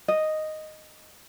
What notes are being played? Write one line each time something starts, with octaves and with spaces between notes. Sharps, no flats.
D#5